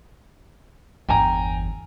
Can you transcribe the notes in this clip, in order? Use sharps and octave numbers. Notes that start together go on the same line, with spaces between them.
G1 E2 G5 G#5 A#5